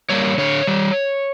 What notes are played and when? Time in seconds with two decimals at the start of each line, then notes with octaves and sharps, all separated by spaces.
0.10 G3 A#3 C#5
0.38 D3 C#5
0.67 G3